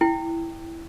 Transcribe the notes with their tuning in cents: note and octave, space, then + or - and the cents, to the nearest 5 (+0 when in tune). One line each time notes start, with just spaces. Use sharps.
E4 +0 G5 +0